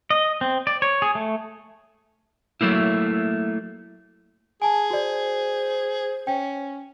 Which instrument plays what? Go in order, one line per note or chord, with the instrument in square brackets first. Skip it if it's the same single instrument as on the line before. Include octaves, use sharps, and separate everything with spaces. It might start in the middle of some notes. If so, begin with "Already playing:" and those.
[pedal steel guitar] D#5
C4
D5
C#5
G#4
A3
[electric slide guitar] F#3 A3 A#3 E4
[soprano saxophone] G#4 [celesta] G#5 A5
[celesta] F#4 D5 [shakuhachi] C5
[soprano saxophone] C#4 [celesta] G5